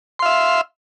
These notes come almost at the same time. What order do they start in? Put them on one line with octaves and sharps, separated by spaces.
C6 F5 E5